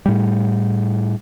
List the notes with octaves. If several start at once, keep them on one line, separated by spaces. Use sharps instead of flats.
A2 G3